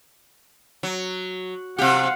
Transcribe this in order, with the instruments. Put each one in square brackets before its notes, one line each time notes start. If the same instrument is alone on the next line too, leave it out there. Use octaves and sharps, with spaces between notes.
[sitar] F#3
[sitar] C3 G4 [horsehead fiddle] F5 F#5